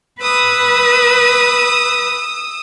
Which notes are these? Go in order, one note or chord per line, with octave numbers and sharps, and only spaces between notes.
B4 D#6 E6